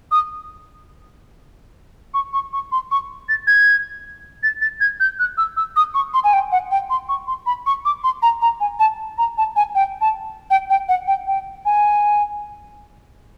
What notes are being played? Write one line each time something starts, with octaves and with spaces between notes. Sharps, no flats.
D#6
C#6
C#6
C#6
C6
C#6
A6
G#6
A6
A6
G#6
G6
F#6
E6
E6
D#6
C#6
C6
G#5
G5
F#5
G5
C6
C#6
C6
B5
C#6
D6
C6
A#5
A#5
G#5
A5
A#5
A5
G#5
G5
A5
G5
G5
F#5
G5
G5
G#5